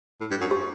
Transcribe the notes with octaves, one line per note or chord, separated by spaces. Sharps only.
A2
G2
F#2
G4